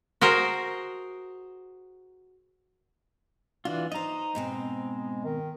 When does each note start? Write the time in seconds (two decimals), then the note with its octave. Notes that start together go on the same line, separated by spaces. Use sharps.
0.21 F#4 G#4 A#4 C5
3.65 E3 D4 F4 F#4
3.92 D#4 C5 D#5 A#5
4.35 G#2 B2 G#3 C4
5.24 D#3